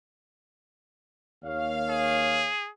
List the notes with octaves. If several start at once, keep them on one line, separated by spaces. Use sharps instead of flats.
D#2 C#5 F5
G#4